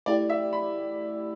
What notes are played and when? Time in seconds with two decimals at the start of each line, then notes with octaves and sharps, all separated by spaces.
0.06 A3 E4 G4 D5
0.30 E5
0.53 B5